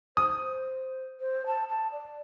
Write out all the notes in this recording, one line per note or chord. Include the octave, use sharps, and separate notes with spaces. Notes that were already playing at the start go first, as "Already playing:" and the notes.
C5 D#6
C5
A5
A5
D5